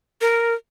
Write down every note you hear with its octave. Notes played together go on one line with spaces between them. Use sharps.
A#4